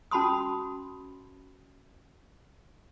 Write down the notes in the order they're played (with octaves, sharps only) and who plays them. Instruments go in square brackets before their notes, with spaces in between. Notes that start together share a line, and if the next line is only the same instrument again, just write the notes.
[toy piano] C#4 F#4 A5 B5 C6 D#6